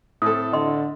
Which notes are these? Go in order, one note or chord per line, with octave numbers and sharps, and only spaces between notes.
A2 C4 E4 A4 D#6
D3 D#5 C6